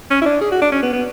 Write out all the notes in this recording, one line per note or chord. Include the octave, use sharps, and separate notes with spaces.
C#4
E4
D4
G#4
F#4
D4
C#4
B3
B3